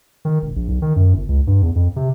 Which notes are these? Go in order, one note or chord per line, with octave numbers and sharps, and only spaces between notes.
D#3
E1
A#1
B1
D#3
F#2
G1
C#2
G2
E2
F2
C3